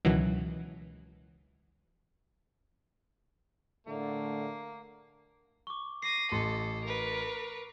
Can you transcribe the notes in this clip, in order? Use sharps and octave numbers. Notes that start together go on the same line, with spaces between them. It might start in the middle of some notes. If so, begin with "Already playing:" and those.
C#2 B2 D#3 E3 F#3
A2 D3 A3 A#3
C#6 D6
D6 A#6 C7 D#7
A1 A4 D#5 C6
A#4 B4